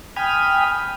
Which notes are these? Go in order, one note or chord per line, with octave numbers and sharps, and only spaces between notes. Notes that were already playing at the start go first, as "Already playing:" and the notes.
G5 G#5 B5 D#6 F6